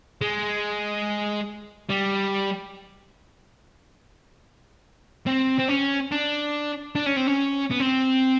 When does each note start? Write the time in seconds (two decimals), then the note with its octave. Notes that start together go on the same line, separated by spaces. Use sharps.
0.21 G#3
1.90 G3
5.27 C4
5.59 C4
5.69 C#4
6.12 D4
6.95 D4
7.06 C#4
7.17 C4
7.27 C#4
7.71 B3
7.80 C4